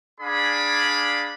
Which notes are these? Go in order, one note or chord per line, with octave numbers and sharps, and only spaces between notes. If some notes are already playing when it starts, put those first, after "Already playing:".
D4 G#4 D5 F5 G#5 B5